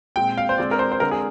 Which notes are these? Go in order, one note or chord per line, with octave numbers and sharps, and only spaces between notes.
A#2 G#3 C4 G5
F5
C5
D3 G#3 C4 D5
A#4
C5
C5
D3 G#3 C4 A#4
G#4